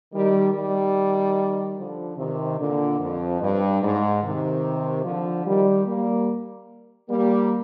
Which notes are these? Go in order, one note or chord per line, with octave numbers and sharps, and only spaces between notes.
D#3 G3
D#3 G3
D3 F3
C3 D#3
A#2 D3
F2
G2
G#2
C3 D#3
D3 F3
D#3 G3
G3 A#3
G3 A#3